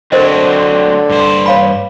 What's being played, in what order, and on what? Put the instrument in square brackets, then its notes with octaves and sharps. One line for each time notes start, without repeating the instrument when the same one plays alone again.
[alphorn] D3 [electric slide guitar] F#3 C4 [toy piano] A#4 C5 D#5
[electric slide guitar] G2 C5
[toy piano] C#5 F5 B5